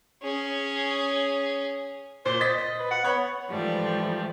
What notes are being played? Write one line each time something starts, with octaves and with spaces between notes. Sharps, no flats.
C#4 G#4
A#2 C5
D#5 A6 B6
B4
F#5
B3 C#5 B5
G#2 E3 F3 G3 A3